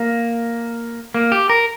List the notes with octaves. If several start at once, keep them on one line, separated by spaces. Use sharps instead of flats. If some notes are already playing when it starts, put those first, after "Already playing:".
Already playing: A#3
A#3
G4
A#4